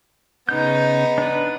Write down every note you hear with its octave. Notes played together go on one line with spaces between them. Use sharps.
C#3 B3 D#4 G6
D4 B4